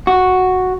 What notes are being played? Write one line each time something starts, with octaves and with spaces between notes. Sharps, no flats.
F#4